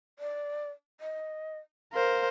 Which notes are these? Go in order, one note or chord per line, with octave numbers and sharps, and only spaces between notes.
D5
D#5
A#4 C5 F5